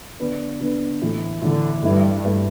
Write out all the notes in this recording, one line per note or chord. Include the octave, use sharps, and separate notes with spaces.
D3 B3 D4 B4
D3 B3 D4 B4
A2 E3 A3
A2 D3 E3 A3
G2 A3 E4 B4
A3 E4 B4